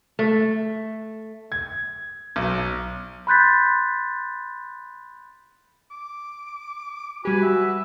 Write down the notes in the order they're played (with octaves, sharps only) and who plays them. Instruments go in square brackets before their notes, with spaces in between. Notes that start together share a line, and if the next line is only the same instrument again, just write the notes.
[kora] A3
[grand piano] G#6
B1
[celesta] B5 C6 F#6 G6 A6 B6
[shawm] D6
[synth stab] G3 G4 [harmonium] F#4 [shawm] B4 [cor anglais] G#5
[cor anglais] E5